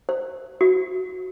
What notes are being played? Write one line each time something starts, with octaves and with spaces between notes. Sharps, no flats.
C5
F#4